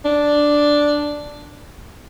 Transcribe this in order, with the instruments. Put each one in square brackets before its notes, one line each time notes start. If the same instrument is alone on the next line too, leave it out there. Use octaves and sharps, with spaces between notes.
[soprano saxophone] D4